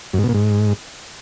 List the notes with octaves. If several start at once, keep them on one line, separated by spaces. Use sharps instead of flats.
F#2
G#2
B2
A#2
G#2